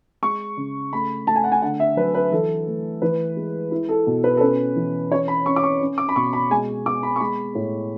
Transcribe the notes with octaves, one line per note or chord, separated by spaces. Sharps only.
G#3 C#6
C#3
A3 B5
A3 A5
G#5
F#5
G#5
D3 F#5
E5
F#3 B4
B4
E3 A4
A3
E3 B4
G#3
E4
A4
B2
B4
A4
C#4 B4
E3
C#4 C#5
B5
C#4 C#6
D6
C#6
C#4
D6
B5
B2 C#6
B5
G#3 G#5
B3 D6
B5
C#6
G#3 B5
A2